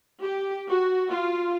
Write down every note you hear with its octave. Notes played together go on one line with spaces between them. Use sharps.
G4
F#4
F4